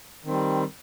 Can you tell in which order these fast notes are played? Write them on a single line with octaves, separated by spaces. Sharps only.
D#3 C4 G3